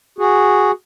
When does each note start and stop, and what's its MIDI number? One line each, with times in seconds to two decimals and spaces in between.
0.18 0.71 66
0.18 0.71 68